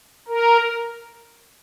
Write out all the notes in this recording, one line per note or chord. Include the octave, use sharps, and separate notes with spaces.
A#4